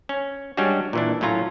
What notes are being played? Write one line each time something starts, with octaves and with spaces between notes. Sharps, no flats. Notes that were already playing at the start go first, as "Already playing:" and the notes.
C#4
G3 G#3 C#4 D4 F#4
A#2 E3 D4
A2 F#3 C#4 F4 A#5